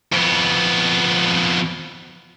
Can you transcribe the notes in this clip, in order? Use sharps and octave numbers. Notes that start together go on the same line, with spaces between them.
F2 B3